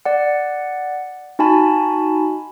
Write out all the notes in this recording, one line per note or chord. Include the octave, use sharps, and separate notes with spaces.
D5 F#5
D#4 F#4 G#5 A5 B5